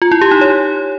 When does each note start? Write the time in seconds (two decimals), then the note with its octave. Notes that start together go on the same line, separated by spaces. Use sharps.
0.02 F4
0.12 E4
0.21 G4
0.31 D#4
0.41 C#5